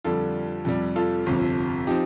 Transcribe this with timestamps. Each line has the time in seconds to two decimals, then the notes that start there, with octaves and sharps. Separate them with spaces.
0.04 F2 D3 G3 F4 A4
0.65 F2 C3 G3
0.96 F4 A4
1.26 G1 F2 C3
1.87 F3 C4 D#4 G4